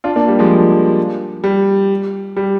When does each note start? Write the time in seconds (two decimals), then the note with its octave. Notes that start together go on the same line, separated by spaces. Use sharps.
0.04 D4 F4
0.16 A#3 D4
0.28 G3
0.39 F3 G#3
1.44 G3
2.37 G3